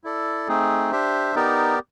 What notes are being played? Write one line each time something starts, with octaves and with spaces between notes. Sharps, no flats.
E4 A4 D5
A3 C4 D#4 G#4
D4 G4 C5 E5
B3 D#4 G4 A#4 D5